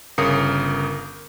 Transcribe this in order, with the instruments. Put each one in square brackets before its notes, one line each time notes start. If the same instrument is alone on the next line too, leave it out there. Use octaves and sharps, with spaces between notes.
[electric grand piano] G1 C#3 A#4 F5 D#6 C#7